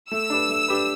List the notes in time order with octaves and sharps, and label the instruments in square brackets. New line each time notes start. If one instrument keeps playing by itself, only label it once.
[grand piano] A3 [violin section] E6
[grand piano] D4 G4 B4
A3
D4 G4 B4